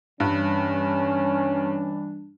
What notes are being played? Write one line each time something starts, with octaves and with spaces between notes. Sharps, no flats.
G2 E3 G3 C#4 D4